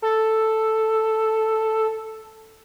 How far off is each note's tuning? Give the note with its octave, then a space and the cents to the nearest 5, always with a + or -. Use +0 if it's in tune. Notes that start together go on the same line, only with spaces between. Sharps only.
A4 +0